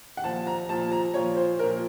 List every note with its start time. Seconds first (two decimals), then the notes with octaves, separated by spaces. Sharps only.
0.17 F#5
0.24 A#2 F3 A5
0.47 A#5
0.69 A#2 F3 A5
0.92 A#5
1.14 A#2 F3 C#5
1.36 C5
1.59 A#2 F3 A#4